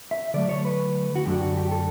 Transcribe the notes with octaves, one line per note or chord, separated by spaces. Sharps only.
E5
D3 F#3 A3 D5
C#5
B4
F#4
F#2 D3 A3 D4 G4
F#4
G4
A4